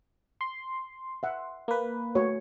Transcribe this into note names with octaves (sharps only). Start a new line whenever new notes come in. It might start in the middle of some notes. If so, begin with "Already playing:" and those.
C6
E5 F#5
A#3 B4
A3 F#4 C#5